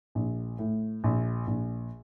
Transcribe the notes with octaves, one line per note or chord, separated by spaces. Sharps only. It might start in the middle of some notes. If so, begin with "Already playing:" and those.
A#1
A2
A#1
A#1